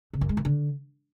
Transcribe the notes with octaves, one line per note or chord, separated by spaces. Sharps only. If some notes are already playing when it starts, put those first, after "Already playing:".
C#3
F#2
G#3
D#3
D3